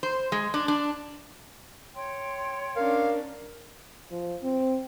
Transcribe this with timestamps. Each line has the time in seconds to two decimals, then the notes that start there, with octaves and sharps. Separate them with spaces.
0.03 C5
0.32 G#3
0.54 D4
0.68 D4
1.94 C#5 G5 C6
2.76 C#4 D4 A#4 F5
4.11 F3
4.43 C4